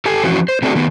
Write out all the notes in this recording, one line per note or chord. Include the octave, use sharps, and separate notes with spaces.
G4 A4 G#5
E3 F3 C#4 E4 F#4
C5
A3 C4 D4 F#4 G#4
D#3 B3